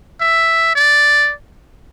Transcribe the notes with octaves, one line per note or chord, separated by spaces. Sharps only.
E5
D5